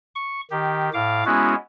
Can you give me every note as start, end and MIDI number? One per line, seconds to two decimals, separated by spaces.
0.15 0.41 85
0.51 0.90 51
0.51 0.90 67
0.94 1.24 45
0.94 1.24 77
0.94 1.24 86
1.26 1.55 56
1.26 1.55 59
1.26 1.55 61
1.26 1.55 64
1.26 1.55 66